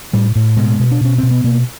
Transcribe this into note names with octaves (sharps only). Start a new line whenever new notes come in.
A2 G3
A2
B2 G#3
B2
D4
B2 C#4
B2 C4
B3
B2 A#3